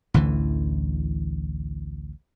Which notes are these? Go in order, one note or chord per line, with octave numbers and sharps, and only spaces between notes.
A1 D2 D3 E3